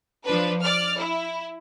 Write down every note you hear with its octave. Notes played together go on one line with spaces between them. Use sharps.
F3 D4 B4
D5 F6
E4